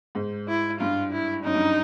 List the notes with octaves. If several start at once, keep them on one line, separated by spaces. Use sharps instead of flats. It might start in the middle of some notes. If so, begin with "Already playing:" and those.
G#2
E4
G2 F4
E4
F#2 D#4
G2